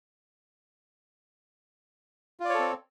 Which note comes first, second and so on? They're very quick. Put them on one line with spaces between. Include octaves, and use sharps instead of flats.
F4 D5 C#5 A4 C4